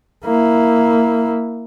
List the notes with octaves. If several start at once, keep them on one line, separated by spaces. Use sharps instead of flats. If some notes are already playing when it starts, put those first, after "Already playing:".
A#3 E4